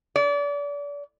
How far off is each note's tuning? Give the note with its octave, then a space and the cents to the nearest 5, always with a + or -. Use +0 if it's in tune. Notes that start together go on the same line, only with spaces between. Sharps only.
D5 -35